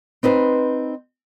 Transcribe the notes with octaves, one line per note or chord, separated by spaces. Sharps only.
C4 D#4 B4 C5